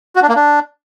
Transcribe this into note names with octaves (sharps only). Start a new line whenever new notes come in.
F#4
D4
A#3
D4